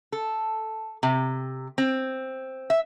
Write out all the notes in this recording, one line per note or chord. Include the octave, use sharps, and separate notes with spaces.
A4
C3
C4
E5